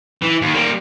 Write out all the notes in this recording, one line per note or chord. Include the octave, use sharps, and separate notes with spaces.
E3
D#2
G3 A#3